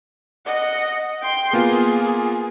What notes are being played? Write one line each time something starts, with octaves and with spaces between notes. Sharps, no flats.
D#5 F#5
G5 C6
A#3 B3 F4 G#4